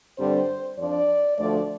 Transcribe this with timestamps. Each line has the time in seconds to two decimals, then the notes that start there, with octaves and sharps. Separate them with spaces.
0.18 G2 D3 G3 C4 C5
0.78 F2 F3 D4 D5
1.38 D2 D3 F3 A3 D5